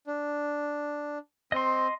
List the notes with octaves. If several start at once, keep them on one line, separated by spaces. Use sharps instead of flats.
D4
C4 D#5 C6